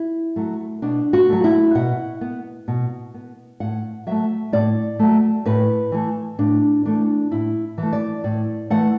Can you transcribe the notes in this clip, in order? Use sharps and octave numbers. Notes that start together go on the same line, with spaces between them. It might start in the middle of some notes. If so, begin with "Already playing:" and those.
Already playing: E4
F#3 A3
B2 D4
F#4
F#3 A3
E4
B2 F#5
B3
B2
B3
A2 F#5
F#3 A3 E5
A2 D5
F#3 A3
A2 B4
E3 A3
A2 D4
E3 A3 D4
A2 E4
E3 A3
D5
A2 D5
E3 A3 F#5